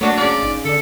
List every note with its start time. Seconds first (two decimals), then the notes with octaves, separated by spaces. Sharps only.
0.01 F#3 A3 A#3 D4 F#4
0.17 C#3 F4 D5
0.43 G#1 D#4
0.65 D3 A4 D5